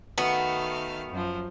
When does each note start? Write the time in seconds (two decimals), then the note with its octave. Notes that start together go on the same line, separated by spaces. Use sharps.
0.18 D#3 A3 B3 F#4 F5
1.11 F#2 F3